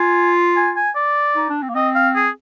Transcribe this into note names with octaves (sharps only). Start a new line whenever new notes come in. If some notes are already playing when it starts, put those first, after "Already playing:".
Already playing: F4 G#5
G#5
G#5
D5
D#4
D4
C4
A#3
C4 D#5
F5
G#4